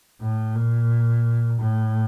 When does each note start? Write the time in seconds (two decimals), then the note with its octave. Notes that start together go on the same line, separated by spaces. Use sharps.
0.21 A2
0.55 A#2
1.60 A2